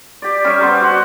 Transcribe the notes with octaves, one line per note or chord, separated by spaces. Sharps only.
G4 D5
G3 C#4 E5 C#6
B3 C5 A#5 D6
F#4 C5 F#5